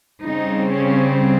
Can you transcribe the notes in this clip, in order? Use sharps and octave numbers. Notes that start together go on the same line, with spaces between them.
C#3 G3 C4 D#4
C#4